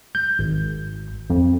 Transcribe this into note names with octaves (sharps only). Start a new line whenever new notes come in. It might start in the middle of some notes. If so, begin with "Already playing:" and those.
G6
G#1
F2